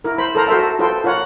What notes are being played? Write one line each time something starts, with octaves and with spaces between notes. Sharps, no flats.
E4 A#4
C5 B5
A4 A#4 C5 A#5
F#4 A4 A#4 C5 E5
F4 A4 B4 C5 G5
F4 A#4 C#5 F#5